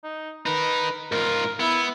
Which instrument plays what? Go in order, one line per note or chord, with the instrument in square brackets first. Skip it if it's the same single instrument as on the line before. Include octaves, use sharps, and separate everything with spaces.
[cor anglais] D#4
[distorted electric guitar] D#4 A#4 [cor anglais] B4
[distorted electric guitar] G#2 F4 [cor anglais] A#4
[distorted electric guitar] B3 [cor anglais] E4